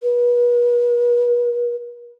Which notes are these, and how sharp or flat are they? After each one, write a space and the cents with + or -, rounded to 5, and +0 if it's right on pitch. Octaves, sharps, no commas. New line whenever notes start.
B4 -40